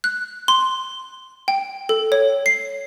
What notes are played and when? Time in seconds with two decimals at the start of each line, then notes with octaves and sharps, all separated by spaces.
0.04 F#6
0.48 C6
1.48 G5
1.89 A4
2.12 C#5
2.46 C7